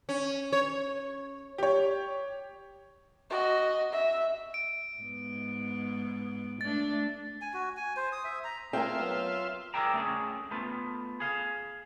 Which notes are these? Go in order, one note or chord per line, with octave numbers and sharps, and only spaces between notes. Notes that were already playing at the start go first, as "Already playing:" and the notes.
C#4
C#5
G4 C#5
F#4 D#5
E5
D7
G#2 B3
A3 D4 A6
G#5
F#4
G#5
C5
D#6
E5
A#5
A3 C4 F4 G#4 A#4 E5 G5 C6
F#3 B3
G#4 A#4 D5 E5 G5 A#5
A3 C#4 G#4
A3 B3 F4
G#4 F5